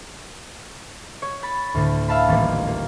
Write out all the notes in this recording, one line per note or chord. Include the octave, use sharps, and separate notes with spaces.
C#5
B5 A6
D2 A2 D3
E5 F5 A5 B5
D#1 A1 G3 A#3
A#3